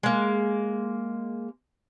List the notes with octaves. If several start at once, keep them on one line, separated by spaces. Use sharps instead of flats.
G#3 A#3